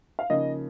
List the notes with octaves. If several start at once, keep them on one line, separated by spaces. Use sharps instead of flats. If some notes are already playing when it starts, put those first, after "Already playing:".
F5
C#3 F3 A#3 D#4 D#5